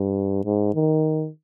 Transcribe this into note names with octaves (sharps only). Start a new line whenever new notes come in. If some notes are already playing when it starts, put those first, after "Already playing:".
Already playing: G2
G#2
D#3